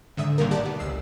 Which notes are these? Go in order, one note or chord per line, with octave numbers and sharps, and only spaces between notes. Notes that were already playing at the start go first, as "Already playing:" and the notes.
G#2 D3 E5 D#6
A1 A#2 D#3 G3 A#3 A#4
G4 D5 F#5 A5
B3
G1 C#2 E6 C7